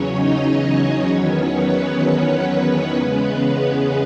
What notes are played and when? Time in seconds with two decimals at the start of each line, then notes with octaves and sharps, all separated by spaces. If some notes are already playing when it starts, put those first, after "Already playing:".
Already playing: E2 C#3 F#3 C#4 C#5
0.15 D#4 D#5
0.62 D#4 D#5
1.08 E2 D#3 F#3 B3 C#4 C#5
1.55 B3 B4
2.03 C#4 C#5
2.49 B3 B4
2.96 E2 C#3 G#3 C#4